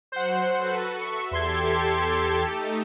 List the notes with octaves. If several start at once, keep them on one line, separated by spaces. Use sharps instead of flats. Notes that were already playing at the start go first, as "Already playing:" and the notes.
F#3 C5 F#5
F#4 A4 B4
E5 C#6
E2 G4 A4 C6 G#6
A3 D#4